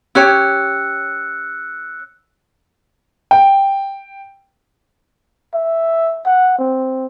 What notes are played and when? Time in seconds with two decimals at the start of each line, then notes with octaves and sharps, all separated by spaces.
0.15 C#4 G4 C#5 E6 F#6 C#7
3.31 G5
5.54 E5
6.26 F#5
6.59 C4